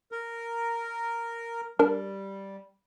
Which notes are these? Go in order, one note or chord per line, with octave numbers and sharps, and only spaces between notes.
A#4
G3 D4 A#4